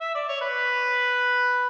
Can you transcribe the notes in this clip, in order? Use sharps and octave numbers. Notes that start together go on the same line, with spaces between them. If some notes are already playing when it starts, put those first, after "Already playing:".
E5
D5
C#5
B4